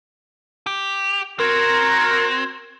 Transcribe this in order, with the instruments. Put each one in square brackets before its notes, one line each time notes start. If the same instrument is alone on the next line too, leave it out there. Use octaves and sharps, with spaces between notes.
[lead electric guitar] G4
[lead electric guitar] C4 [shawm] F#4 [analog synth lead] A#4 [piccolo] G#6